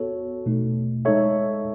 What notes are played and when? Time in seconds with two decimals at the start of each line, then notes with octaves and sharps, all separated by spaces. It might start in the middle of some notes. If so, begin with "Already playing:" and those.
Already playing: B3 F#4 A4 C#5
0.46 B2 A3 D#4
1.05 G#3 D#4 A4 C#5 E5